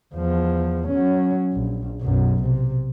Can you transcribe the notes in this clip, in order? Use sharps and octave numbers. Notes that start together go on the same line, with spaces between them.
E2 F3
F#3 C#4
A#1
B1 F#2
C3